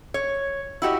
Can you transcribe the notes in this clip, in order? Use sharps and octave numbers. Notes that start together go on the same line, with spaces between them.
C#5
E4 F#4 G4 D#5